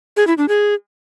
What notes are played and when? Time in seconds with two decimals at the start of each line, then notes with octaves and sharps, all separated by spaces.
0.17 G#4
0.27 E4
0.38 D4
0.48 G#4